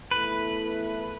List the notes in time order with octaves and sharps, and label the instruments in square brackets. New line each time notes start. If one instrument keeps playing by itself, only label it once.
[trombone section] E2 E3 A3 E4 A4 [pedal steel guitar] B4